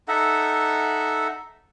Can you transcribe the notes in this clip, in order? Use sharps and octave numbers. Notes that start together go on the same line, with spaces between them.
D#4 A4 E5 F#5